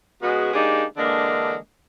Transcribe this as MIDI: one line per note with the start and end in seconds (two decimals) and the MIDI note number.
0.23 0.52 49
0.23 0.52 56
0.23 0.52 59
0.23 0.52 66
0.53 0.84 56
0.53 0.84 58
0.53 0.84 62
0.53 0.84 63
0.53 0.84 67
0.97 1.55 50
0.97 1.55 52
0.97 1.55 56
0.97 1.55 58
0.97 1.55 62